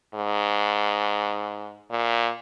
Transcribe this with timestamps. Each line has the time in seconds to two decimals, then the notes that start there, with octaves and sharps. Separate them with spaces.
0.15 G#2
1.91 A#2